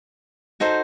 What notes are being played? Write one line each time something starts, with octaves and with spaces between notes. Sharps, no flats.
D#4 F#4 A4 C5